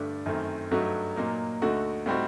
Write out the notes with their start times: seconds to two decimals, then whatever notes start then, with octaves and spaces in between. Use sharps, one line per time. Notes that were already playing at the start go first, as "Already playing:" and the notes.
Already playing: G2 D3 A3 D4
0.26 F#2 D#3 A3 C4
0.71 G2 F#3 A3 D#4 F#4
1.16 A#2 F#3 A#3 D#4
1.62 D2 D3 A3 D#4 F#4
2.06 A2 G3 C4 D#4 F#4